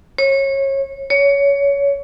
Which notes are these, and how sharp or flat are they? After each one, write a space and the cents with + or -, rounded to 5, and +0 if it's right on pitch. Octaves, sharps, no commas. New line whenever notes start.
C#5 -25
C#5 +20